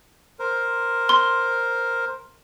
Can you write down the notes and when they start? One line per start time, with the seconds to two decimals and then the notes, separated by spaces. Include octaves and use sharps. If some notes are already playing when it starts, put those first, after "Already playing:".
0.39 A#4 C5
1.09 C6